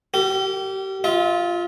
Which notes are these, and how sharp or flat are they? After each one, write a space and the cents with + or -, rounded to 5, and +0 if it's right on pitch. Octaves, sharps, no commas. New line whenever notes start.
G4 -30 A#4 -45
F4 +0 E5 -45